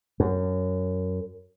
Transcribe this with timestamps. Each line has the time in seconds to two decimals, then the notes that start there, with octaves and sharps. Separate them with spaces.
0.20 F#2